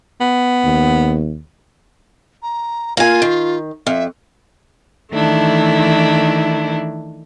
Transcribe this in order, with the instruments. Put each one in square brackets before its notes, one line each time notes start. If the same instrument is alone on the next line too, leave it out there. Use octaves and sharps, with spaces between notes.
[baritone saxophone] B3
[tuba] D#2
[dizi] A#5
[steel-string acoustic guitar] A#3 G#5 [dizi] F4
[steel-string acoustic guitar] D#3
[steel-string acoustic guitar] F2 [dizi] E5
[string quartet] D#3 E3 A3 D4 E4